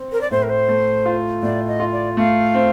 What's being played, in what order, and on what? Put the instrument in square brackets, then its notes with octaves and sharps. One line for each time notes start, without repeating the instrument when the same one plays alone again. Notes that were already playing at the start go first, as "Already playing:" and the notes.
Already playing: [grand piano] C4
[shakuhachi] A#4
D5
[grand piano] A2 [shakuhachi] C5
[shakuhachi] A#4
C5
[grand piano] A3
F4
[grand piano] A2 [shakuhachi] D5
[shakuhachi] D#5
[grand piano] F4
[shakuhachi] D5
[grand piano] A3 [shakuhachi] F5
[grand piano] C4